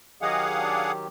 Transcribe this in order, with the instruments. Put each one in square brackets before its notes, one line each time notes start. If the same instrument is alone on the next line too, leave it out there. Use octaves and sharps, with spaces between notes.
[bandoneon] D#3 F#3 G4 [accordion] G#4 F5 F#5 [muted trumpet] D#5
[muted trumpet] D4